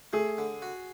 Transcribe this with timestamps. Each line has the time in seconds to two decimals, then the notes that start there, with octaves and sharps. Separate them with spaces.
0.13 A3 G#4
0.38 D3
0.62 F#4